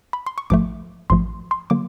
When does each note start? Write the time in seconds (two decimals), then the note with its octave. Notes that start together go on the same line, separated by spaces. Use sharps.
0.13 B5
0.26 C6
0.38 C#6
0.50 A1 G#2 F3 A3 D6
1.10 A1 G#2 F3 A3 C6
1.51 C6
1.70 D3 F#3 A#3 D6